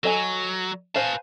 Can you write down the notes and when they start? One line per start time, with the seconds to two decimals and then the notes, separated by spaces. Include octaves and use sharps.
0.04 F#3 A4 D#5 G#5
0.95 B4 C5 F5 G#5 A5